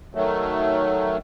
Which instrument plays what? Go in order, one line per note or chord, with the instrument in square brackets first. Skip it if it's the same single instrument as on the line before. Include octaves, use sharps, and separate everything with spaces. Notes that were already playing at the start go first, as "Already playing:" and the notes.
[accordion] D#3 F#3 A3